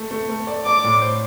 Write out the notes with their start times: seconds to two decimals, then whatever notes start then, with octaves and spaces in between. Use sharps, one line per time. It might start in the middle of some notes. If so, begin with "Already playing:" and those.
Already playing: A3
0.11 A3
0.29 A3
0.47 D5
0.66 D5 D6
0.84 A2
1.02 C5